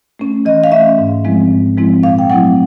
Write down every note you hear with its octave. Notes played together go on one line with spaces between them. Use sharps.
A3 C#4
E3 D#5
F5
A3 C#4 E5
G#2
F3 G#3 C4 E4
G#2
F3 G#3 C4 E4
A#2 F5
G5
F#3 A3 C4 E4 F#5